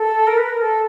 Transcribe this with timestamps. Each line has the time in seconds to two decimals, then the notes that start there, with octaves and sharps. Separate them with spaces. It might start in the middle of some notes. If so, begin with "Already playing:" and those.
Already playing: A4
0.27 A#4
0.37 B4
0.49 A#4
0.61 A4